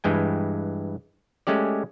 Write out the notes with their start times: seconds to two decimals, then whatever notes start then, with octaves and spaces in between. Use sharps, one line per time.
0.04 G2 E3 G#3 G5 G#5
1.47 G#3 A3 C#4 G4 D5